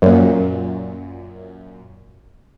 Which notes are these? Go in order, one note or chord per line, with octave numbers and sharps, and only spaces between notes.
F#2 A#2